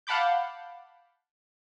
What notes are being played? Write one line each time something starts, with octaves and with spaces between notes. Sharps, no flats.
F5 F#5 A5 B5 D6 G6